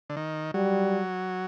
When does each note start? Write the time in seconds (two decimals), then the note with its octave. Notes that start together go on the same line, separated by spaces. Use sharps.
0.10 D3
0.17 D#3
0.54 F#3 G3